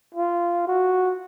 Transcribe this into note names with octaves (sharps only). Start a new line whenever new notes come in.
F4
F#4